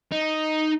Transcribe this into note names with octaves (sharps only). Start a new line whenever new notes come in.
D#4